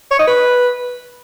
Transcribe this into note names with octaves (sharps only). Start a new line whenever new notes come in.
C#5
D#4
B4